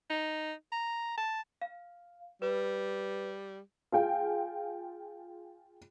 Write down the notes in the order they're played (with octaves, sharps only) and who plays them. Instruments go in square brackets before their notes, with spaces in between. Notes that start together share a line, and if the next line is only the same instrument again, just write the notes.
[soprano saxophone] D#4
A#5
A5
[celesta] F5
[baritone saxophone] G3 [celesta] B4
[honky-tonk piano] F4 G#4 G5